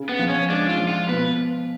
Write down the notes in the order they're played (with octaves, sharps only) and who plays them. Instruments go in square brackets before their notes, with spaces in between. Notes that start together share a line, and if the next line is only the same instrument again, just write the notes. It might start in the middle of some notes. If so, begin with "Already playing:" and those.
Already playing: [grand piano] C#3
[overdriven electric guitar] B3
[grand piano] F3
[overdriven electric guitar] C#4
[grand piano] G#3 [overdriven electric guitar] D4
[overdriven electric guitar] F4
[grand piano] F3
[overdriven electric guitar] F4
[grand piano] B2 [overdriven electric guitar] B4